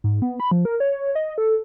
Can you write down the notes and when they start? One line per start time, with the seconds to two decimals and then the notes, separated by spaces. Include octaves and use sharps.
0.04 G#2
0.22 B3
0.40 B5
0.51 F3
0.65 A#4
0.80 C#5
1.15 D#5
1.38 A4